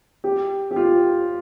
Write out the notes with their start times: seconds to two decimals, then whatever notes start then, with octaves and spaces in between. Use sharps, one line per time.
0.24 G4
0.71 G4
0.76 F4